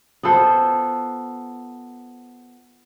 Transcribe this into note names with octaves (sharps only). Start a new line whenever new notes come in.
B3 F4 A4 C5